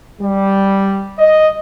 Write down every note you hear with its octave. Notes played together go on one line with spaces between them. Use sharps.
G3
D#5